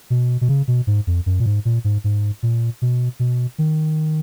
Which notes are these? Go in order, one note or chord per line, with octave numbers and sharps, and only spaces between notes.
B2
B2
C#3
B2
G#2
F2
F#2
A#2
G#2
A#2
G#2
G#2
A#2
B2
B2
D#3